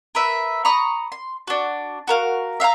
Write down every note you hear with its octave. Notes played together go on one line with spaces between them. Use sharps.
A#4 B4 E5
A#5 B5 C#6 D#6
C6
D4 F#4
F#4 A#4 F5
E5 F5 G5 A#5